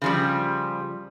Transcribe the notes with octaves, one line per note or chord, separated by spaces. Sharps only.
C#3 F3 G3